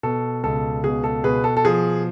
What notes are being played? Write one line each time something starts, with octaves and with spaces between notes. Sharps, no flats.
B2 A4
C#2 A4
B2 G#4
A4
B2 G#4 B4
A4
A4
F3 G#4